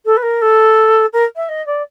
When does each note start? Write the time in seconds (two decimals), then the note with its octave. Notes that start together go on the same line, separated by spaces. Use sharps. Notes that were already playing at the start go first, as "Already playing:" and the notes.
0.05 A4
0.17 B4
0.22 A#4
0.41 A4
1.13 A#4
1.36 E5
1.48 D#5
1.66 D5